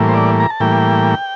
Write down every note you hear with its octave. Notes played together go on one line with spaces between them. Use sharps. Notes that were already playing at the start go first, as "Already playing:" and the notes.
Already playing: A2 E3 G3 A#3
C5
D5
A#5
A5
A2 E3 G3 A#3 G5